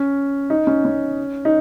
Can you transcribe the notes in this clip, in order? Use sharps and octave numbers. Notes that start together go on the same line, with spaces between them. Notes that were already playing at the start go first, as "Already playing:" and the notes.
Already playing: C#4
D#4
C#4
C#4
D#4